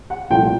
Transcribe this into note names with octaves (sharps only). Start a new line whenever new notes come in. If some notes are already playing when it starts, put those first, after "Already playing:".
F#5
C2 A#2 F3 A3 G5